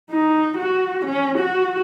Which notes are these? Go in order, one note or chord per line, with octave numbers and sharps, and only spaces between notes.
D#4
F#4
C#4
F#4